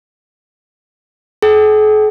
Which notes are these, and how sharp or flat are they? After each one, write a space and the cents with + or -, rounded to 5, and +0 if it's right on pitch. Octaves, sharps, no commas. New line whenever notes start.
G#4 +45 G5 -40